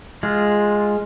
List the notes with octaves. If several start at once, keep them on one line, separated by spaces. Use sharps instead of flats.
G#3 F4